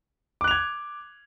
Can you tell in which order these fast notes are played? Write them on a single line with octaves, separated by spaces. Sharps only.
D6 F#6 F7 G#6